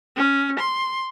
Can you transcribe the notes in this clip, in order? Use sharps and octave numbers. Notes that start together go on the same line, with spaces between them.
C#4
C6